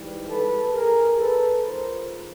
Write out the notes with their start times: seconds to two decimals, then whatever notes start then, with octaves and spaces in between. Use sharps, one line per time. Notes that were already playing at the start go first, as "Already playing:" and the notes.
Already playing: G#2 E3 G3
0.29 A4 B4
0.74 G#4 A#4
1.20 A4 B4
1.65 G#2 F3 G#3 A#4 C5